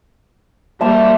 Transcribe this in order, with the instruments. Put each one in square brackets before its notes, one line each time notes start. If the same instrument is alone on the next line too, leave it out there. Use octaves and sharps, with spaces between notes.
[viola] G3 A#3 [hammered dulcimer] E5 A5 C6